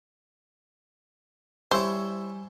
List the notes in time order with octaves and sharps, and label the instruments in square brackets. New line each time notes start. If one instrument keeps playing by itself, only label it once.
[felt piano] G3 G#5 E6 [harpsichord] E4 C#5 [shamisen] C5